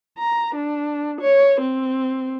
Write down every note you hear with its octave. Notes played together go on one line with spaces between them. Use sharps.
A#5
D4
C#5
C4